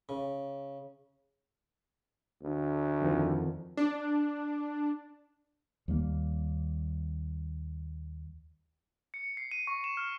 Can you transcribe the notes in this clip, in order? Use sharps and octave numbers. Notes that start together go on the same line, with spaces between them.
C#3
D2
F2 D#3 F3
D4
D#2 G3 A#3
C#7
C7
D#7
C#6
E7
F6